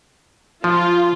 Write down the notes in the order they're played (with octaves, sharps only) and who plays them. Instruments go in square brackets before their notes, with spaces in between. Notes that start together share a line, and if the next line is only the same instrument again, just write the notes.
[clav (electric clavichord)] F3 [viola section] F4